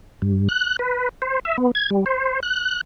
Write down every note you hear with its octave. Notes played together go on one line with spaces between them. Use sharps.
G2
F#6
B4
C5
E5
B3
G#6
G3
C5
F#6